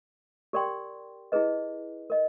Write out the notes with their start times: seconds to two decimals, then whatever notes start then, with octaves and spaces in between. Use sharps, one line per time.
0.53 G4 A#4 D5 G5 C6
1.32 E4 G#4 B4 D#5
2.10 A#4 D#5